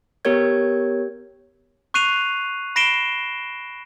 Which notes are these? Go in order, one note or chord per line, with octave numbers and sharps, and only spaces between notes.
B3 G4 A#4 C#5 G#6
C#6 F#6 C7 D#7 F7
B5 A#6 C7 D7 E7 G7